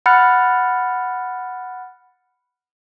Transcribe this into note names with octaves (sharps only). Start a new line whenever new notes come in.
F#5 B5 F6 F#6 A6 C#7